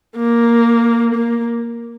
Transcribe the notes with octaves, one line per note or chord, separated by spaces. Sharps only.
A#3
A#3